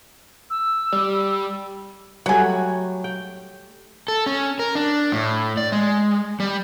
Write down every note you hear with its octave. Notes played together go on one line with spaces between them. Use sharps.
E6
G3
F#3 G3 A3 F#5 G#5
G5
A4
C#4
A#4
D4
A2
D5
G#3
G3